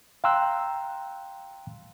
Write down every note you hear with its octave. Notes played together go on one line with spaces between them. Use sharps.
F5 G5 A#5 C6 E6 F#6